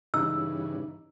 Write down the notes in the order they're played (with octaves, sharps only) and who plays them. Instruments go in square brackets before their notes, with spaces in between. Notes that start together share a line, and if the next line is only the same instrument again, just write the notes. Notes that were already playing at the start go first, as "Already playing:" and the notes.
[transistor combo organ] G2 C#3 E3 [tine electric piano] D#4 [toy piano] E6